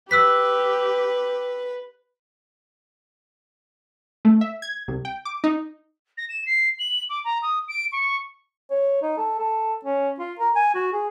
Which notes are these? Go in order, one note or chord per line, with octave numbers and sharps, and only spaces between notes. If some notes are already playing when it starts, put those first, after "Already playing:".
G4 B4 E6 F#6 B6
A3
E5
G#6
C2
G5
D6
D#4
A#6
E7
C7
F#7
D6
A#5
D#6
D7
C#6
C#5
D#4
A4
A4
C#4
F4
A#4
G#5
F#4
G#4